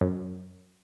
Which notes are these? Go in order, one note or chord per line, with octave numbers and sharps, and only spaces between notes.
F#2